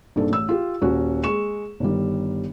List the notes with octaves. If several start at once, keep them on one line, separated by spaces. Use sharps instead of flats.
A#1 G2 D#4 A4
A1 E6
F4 G4
D#1 C#4 F#4
G#3 C#6 E7
G1 D#3 G3